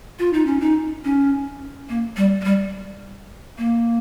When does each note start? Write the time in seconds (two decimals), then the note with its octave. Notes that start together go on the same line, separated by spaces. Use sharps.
0.19 F4
0.33 D#4
0.46 C#4
0.61 D#4
1.04 C#4
1.89 A#3
2.17 G3
2.41 G#3
2.44 G3
3.58 A#3